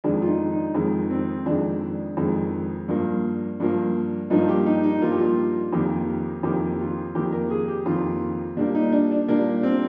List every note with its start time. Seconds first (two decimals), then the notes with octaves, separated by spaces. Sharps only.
0.04 F2 D#3 G#3 D4
0.22 F4
0.28 D#4
0.52 D#4
0.75 F2 D#3 G#3
1.10 C4
1.46 F2 D#3 G#3 D4
2.17 F2 D#3 G#3
2.88 G2 F3 A#3
3.60 G2 F3 A#3
4.30 G2 F3 A#3 D#4
4.48 G4
4.66 D#4
4.83 D#4
5.02 G2 F3 A#3 F4
5.11 G4
5.19 F4
5.73 F2 D#3 A#3 G4
6.43 F2 D#3 A#3 G4
6.79 F4
7.15 F2 D#3 A#3 G4
7.32 A#4
7.50 G#4
7.68 G4
7.86 F2 D#3 A#3 F4
8.57 A#2 G3 A#3 D4
8.75 D#4
8.92 D4
9.11 D4
9.28 A#2 G3 A#3 D4
9.63 C4